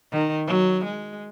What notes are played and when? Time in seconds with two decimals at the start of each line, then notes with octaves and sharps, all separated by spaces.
0.12 D#3
0.47 F#3
0.84 G#3